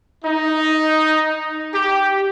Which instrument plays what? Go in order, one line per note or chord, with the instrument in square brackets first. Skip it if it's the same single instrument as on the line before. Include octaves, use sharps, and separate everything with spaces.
[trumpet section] D#4
G4